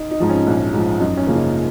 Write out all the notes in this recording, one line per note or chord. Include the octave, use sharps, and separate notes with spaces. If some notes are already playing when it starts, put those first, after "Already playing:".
Already playing: D#4
D#4
G#2 F3
C#4
A#1
G#2 F3
F#2 D#4
C#4
C#3 F3 A#3
D#4